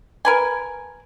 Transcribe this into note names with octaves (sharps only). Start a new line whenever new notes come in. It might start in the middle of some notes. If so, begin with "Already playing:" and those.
A#4 B4 G#5